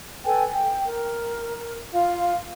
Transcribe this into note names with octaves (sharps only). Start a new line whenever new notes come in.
A4 B4 G5 G#5
G5
A#4
F4 F5